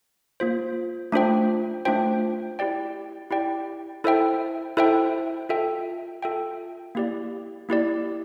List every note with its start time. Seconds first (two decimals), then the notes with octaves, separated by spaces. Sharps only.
0.40 A#3 F4 C5
1.12 A3 D4 F4 C5 G5
1.85 A3 D4 F4 C5 G5
2.59 E4 G4 D5 G5
3.31 E4 G4 D5 G5
4.04 E4 A4 C5 E5 G5
4.77 E4 A4 C5 E5 G5
5.49 F4 A4 E5 G5
6.23 F4 A4 E5 G5
6.95 A#3 E4 G4 D5
7.69 A#3 E4 G4 D5